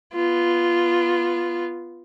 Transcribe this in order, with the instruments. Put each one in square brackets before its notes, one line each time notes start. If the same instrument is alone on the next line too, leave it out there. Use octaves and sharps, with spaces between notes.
[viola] B3 F4